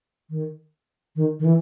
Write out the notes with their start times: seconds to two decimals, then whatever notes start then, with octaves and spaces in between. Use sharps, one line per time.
0.30 D#3
1.16 D#3
1.39 D#3
1.45 E3